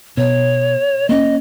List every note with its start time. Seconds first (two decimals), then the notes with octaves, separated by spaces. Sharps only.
0.17 B2 C#5
1.09 A#3 C#4 D#5